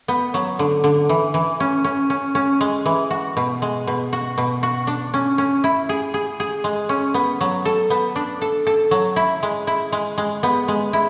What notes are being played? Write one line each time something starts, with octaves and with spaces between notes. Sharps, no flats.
B3
F#3
D3
D3
E3
E3
C#4
C#4
C#4
C#4
G#3
E3
F#4
B2
G#3
B2
F#4
B2
F#4
D4
C#4
C#4
E4
G#4
G#4
G#4
G#3
C#4
B3
F#3
A4
B3
D4
A4
A4
F#3
E4
G#3
E4
G#3
G#3
B3
G#3
E4